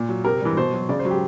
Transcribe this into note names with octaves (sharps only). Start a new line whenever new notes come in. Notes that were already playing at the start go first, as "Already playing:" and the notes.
Already playing: A#2
F#3
C3 A#4
E3 G3
B2 C5
F#3
C#3 D5
C5
F#3
G4